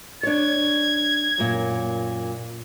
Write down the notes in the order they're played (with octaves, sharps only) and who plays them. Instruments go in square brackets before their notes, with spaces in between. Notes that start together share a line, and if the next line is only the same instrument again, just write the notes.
[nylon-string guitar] D4 C#5 [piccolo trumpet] G#6
[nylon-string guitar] F#2 A#2